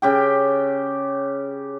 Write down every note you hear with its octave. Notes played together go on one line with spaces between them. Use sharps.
C#3 G4 G5